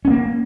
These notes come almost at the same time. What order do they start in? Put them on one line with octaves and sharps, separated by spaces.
C#4 B3 A#3